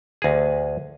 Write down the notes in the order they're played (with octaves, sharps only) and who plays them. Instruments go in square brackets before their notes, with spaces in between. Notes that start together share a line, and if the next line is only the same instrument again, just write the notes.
[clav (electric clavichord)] D2 G#4